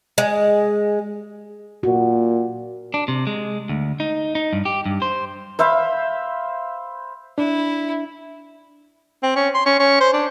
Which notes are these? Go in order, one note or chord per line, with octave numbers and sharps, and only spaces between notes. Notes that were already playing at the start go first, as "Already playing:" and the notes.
G#3
A#2 F#4
D4
C3
G#3
D2
D#4
D#4
G2
G4
G2
C5
C5 E5 F5 B5
D4 E4
C4
C#4
C6
C#4
C#4
C5
D4